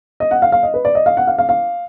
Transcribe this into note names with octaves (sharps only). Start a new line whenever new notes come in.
D#5
F#5
F5
F5
D#5
B4
D5
D#5
F5
F#5
F5
F5
F5